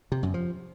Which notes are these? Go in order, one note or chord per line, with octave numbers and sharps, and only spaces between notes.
C3
F#2
F3